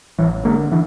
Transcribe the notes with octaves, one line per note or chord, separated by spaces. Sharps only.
A1 E3 F#3
D3 G#3 A#3
D3 E3